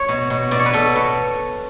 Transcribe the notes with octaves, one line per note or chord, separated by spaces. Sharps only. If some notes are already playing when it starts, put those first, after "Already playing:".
Already playing: C#5
B2
B2
B2 D5
C#5
B4
B2 A4
B2